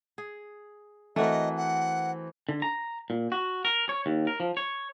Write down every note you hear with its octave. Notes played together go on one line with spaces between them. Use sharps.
G#4
E3 A3 C4 F#4 A#4 D#5
F#5
D3
A#5
A#2
F#4
A#4
C#5
D#2
A#4
F3
C#5